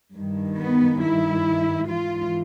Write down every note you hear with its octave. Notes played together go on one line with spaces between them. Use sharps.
G2 D#3
B3
E4
G#2 E3 F4